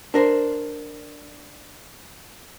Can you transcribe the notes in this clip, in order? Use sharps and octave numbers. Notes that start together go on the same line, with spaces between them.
D4 A#4 C5